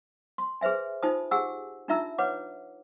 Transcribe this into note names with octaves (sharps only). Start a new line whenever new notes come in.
C6
G#4 B4 C5 E5 G#5
D#4 F4 C5 G#5 A5 D#6
G4 G#4 F#5 G#5 E6
D4 D#4 F4 E5 A#5 E6
B4 C#5 F#5 D6